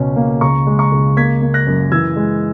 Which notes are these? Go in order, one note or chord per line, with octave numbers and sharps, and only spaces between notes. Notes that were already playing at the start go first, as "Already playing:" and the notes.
Already playing: C#2 B2 C#4
A#3
C#2 A#5 C#6
G#3
A#5 C#6
C#2
A#3 G#6 B6
A#3
F#6 A#6
F#2
E3 E6 G#6
G#3